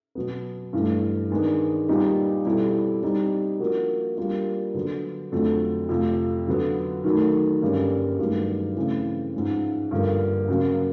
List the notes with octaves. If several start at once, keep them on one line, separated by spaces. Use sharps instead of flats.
B2 F#3 B3
G2 E3 A3
D#3 G#3 B3 D4
A#2 G3 B3 D#4 G4
B2 G3 C4 E4 A4
G3 C4 D#4
F3 A#3 D4 F#4 A#4
G3 A#3 D4 F4
D3 F#3 B3
F2 D3 F#3 A3 C4
F2 C3 F3 A3
D3 F#3 B3
D#3 F#3 A3
G2 D3 G3 A#3 C#4
G2 D#3 F#3 A3
C#3 E3 A3 C4
G#2 F3 G#3 C#4
G2 D3 F3 A#3
C#3 F#3 A#3